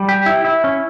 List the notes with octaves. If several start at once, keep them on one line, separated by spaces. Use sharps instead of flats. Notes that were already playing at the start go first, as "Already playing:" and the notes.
Already playing: G3
G4
E4
E4
C#4